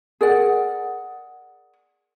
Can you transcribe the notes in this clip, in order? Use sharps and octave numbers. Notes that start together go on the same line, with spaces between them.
G#4 A#4 D5 F#5